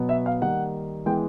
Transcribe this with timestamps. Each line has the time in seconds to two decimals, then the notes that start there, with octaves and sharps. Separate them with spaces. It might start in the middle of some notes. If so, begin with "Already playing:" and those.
Already playing: B2 F#3 B3
0.09 E5
0.26 F5
0.41 D#3 G3 A#3 D#4 F#5
1.06 E3 G#3 B3 G5